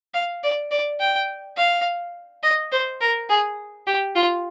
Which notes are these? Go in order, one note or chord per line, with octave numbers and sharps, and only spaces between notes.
F5
D5
D5
G5
F5
D#5
C5
A#4
G#4
G4
F4